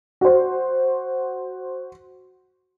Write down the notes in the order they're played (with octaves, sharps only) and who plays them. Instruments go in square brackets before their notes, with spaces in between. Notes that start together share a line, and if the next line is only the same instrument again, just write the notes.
[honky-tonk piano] F#4 C5